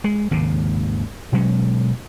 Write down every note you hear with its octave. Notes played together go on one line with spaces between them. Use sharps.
G#3
G#1 D#2 C#3
B2 F#3 G#3 C#4